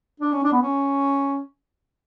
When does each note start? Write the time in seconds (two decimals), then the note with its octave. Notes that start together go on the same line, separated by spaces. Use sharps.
0.20 D4
0.32 C#4
0.44 D4
0.52 B3
0.62 C#4